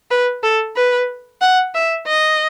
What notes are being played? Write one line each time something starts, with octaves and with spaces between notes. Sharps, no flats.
B4
A4
B4
F#5
E5
D#5